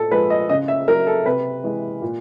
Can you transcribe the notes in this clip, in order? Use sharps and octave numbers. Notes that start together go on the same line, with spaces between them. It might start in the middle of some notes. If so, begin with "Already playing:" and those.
Already playing: A#2 A4
F3 G#3 B4
D#5
C#3 D#5
E5
F#3 A#4
A4
C3 B4
E3 G#3
A#2